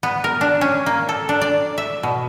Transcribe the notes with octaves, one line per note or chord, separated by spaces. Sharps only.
B3
A#4
D4
C#4
A#3
A4
D4
D5
E5
B2